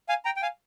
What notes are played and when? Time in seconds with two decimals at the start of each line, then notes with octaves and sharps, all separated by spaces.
0.09 F5 G#5
0.25 G5 A#5
0.36 G5
0.42 F5 G#5